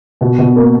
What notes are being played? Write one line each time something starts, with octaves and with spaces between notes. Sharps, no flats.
B2
B2
A#3